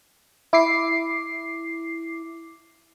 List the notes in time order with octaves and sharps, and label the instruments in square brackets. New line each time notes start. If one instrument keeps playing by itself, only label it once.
[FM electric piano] E4 D6 C7